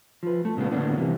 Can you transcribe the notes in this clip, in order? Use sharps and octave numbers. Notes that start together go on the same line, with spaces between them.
F3 B4
A3
A#2 C#3 G#3 B3
A2 D3 G3 A#3 B3 D4
C3 E3 G3 B3